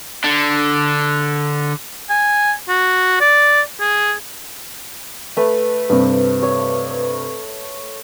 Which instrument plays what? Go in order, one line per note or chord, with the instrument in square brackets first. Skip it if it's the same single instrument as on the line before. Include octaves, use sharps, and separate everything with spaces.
[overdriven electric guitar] D3 D4
[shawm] G#5
F#4
D5
G#4
[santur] A3 B4
[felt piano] G2 C3
[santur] C#5